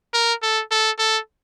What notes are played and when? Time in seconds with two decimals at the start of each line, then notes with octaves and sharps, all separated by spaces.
0.14 A#4
0.42 A4
0.71 A4
0.99 A4